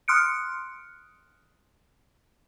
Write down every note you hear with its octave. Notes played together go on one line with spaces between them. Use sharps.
C6 D#6 F6 F#6 C#7 D7